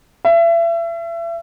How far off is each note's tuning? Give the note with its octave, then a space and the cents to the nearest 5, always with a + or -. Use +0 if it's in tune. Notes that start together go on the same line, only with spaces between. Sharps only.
E5 +35